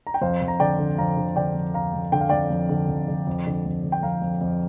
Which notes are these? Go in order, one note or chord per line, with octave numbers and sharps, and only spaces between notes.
A#5
G5
F2 C5 F5
F2
A#5
D3 D5 G5
D3
F2 F5 A#5
D3
D3 D5 G5
F2
F2 F5 A#5
F2
D3 G5
F5
F2 D5 G5
F2
D3
F2
D3
F2
D3
F2
D3
G5
F2 F5 A#5
F2
F2